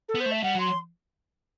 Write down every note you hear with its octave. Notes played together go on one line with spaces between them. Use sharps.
A4
B3 C5
A3
E5
G3 F#5
F#3
C6